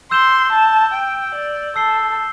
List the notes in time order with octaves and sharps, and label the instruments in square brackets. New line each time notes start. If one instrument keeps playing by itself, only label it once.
[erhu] C6 [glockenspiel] E6 G6 E7 G7
[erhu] A5
G5
D5
[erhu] A4 [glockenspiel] E6 C7 G7